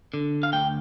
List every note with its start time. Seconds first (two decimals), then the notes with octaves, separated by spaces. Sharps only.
0.14 D3
0.43 F5
0.53 D2 G5